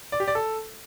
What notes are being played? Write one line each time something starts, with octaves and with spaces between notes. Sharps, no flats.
D5
G4
D5
A4